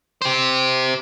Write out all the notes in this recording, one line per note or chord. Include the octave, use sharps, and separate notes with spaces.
G4 C5